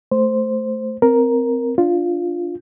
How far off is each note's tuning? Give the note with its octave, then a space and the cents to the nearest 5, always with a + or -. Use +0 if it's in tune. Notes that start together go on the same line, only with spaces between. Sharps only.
A3 +0 C5 +0
C4 -15 A#4 +5
D4 +0 F4 +0